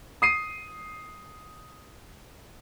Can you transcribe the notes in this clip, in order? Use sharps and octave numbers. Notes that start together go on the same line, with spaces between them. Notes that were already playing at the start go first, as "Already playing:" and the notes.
D#6 C7 D#7